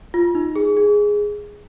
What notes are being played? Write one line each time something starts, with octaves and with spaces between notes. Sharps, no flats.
F4
D#4
G#4
G#4